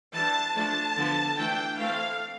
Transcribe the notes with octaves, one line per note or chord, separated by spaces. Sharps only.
E3 G3 D4 A5
F3 A3 D4 A5
D3 F3 B3
E3 A3 D4 G5
E3 A3 C4 F5